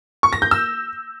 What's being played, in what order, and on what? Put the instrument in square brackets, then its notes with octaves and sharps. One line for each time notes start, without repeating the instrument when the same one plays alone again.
[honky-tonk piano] C#6
A#6
G6
E6